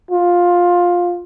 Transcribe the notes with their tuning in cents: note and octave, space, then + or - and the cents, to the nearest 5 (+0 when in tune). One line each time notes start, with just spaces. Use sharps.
F4 +15